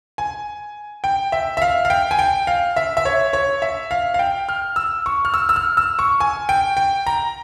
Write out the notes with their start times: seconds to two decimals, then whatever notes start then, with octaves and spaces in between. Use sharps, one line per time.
0.18 G#5
1.04 G5
1.32 E5
1.57 E5
1.62 F5
1.85 F5
1.90 G5
2.11 G#5
2.19 G5
2.47 F5
2.76 E5
2.97 E5
3.05 C#5
3.33 C#5
3.62 E5
3.91 F5
4.14 F5
4.19 G5
4.49 F6
4.76 E6
5.06 C#6
5.25 F6
5.34 E6
5.49 E6
5.56 F6
5.77 E6
5.99 C#6
6.20 G#5
6.49 G5
6.77 G5
7.07 A#5